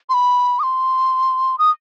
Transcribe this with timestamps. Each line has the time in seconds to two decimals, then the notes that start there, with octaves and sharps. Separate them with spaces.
0.09 C6
0.14 B5
0.59 D#6
0.63 C6
1.59 D#6